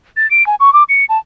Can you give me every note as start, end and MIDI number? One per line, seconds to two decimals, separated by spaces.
0.17 0.29 93
0.31 0.45 98
0.46 0.55 80
0.60 0.72 85
0.73 0.83 86
0.89 1.05 97
1.09 1.18 81